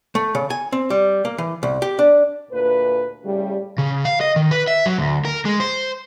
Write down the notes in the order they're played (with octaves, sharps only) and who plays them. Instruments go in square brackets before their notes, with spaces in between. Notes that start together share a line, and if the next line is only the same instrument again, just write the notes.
[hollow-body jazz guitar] A3
C#3
G#5
C4
G3
A#3
E3
C2
G4
D4
[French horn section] D2 A#2 B4
A2 C#3 G3
[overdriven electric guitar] C#3
F5
D#5
D#3
B4
E5
F#3
D2
A#4
G#3
C5